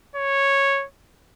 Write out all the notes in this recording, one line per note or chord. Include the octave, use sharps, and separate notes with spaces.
C#5